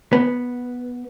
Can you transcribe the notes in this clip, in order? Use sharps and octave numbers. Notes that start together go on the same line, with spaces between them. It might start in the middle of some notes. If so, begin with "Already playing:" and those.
B3